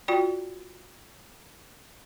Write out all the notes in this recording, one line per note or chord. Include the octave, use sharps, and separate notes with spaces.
F4 F#4 D5 G5